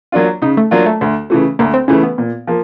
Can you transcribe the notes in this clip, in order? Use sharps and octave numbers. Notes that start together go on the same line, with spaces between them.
F#3 A#3 D4 F4
C#3 D#4
A3
F#3 A#3 D4 F4
A3
D2
C#3 E3 A3
D2 A#3
C4
C#3 E3 A3 C#4
B3
A#2
F3 A#3